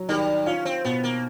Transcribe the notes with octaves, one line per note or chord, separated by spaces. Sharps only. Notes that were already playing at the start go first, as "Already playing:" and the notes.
Already playing: F#3
D#3 G3
C#4 F4
C4
B2 B3
A#3